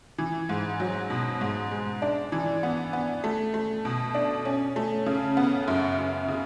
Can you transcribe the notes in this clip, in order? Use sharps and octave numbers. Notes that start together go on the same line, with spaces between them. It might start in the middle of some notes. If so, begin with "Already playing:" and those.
E3
G#2
F#3
B2
G#2
G#3
D4
E3
B3
B3
A3
A3
B2
D4
C#4
A3
C#3
B3
F#2
F#2
C#3